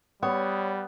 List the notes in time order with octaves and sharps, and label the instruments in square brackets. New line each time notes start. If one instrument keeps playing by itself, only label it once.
[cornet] G3 [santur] B3 [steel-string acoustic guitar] C#5